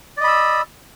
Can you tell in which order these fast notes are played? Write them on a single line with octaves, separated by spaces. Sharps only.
D5 D#5 B5 E6